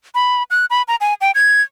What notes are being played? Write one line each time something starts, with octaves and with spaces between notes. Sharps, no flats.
B5
F#6
B5
A#5
G#5
G5
G#6